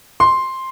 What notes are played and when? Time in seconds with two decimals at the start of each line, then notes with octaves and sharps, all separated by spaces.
0.20 C6